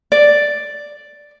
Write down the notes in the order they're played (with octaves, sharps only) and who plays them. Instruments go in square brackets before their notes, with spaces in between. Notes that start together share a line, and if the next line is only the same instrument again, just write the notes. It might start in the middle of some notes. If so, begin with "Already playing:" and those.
[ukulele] D5